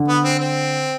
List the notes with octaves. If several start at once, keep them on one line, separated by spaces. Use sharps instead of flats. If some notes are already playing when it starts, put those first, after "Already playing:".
Already playing: D3
B3
C4
C4